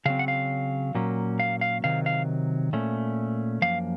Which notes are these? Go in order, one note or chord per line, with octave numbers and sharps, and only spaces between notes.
C#3 F#3 C4 F5
F#5
F5
A#2 F#3 A#3 C#4
F5
F5
C3 D#3 F#3 F5
F5
A#2 A3 C#4
F#2 F3 A#3 F5